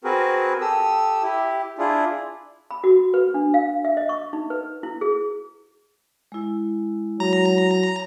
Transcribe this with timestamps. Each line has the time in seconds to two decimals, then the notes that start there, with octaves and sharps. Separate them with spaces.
0.04 C4 F#4 G#4 A#4 B4
0.61 G4 A4 D#6 E6
1.23 E4 G4
1.79 D4 E4 F4 G#4
2.71 B5
2.84 F#4
3.14 B4
3.34 D4
3.54 F5
3.85 E5
3.97 D#5
4.09 C#6
4.33 D#4
4.50 B4
4.83 E4
5.01 G#4
6.32 G#3 E4
7.20 F#3 A#5